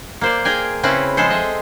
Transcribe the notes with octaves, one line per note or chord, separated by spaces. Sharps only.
A#3 C5 D5
G#4 A#4 G5 G#5
C#3 C4 C#4 E4 B4
F3 G#3 G#4 A4 C5
D#5 E5